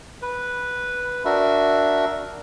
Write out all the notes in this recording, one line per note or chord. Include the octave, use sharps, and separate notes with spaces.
B4
D4 F#4 A#4 E5